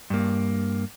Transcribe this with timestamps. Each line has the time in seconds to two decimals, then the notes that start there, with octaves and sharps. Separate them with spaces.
0.10 G2 A#3